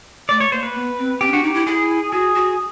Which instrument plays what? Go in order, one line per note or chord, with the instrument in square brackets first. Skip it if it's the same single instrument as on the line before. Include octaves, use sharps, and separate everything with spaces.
[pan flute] A3 [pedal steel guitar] D5
[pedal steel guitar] C#5
[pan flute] A#3 [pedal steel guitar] C5
[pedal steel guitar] B4
[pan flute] B3
C4
[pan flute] C4 [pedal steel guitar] G4
[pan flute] C#4
[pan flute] D4 [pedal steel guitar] F#4
[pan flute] D#4 [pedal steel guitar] G4
[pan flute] E4
[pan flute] E4 [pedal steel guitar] G#4
[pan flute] F#4 [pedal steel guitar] G#4
[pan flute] F#4